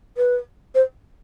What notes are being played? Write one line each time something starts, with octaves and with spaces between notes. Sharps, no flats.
B4
C5